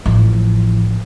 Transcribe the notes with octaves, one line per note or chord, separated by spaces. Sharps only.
A1 F3